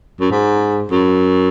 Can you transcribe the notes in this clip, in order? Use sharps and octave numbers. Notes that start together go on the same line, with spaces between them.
F#2
G#2
F#2